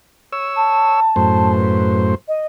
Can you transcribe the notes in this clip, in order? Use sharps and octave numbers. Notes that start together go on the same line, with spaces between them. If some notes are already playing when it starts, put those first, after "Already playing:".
C#5 E6
A5
F#2 A2 C5
B4
D#5